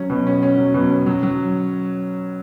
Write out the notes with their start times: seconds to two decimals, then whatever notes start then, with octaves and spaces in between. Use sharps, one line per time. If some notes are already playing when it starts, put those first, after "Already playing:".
Already playing: F#3 C#4
0.10 B2
0.27 C#4
0.42 C#4
0.58 F#3
0.74 B2
0.90 C#4
1.06 F#3
1.23 F#3